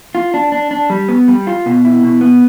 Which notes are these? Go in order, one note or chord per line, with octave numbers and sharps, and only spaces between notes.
F4
D4
D4
D4
G3
B3
G3
F4
B2
E4
B2
B3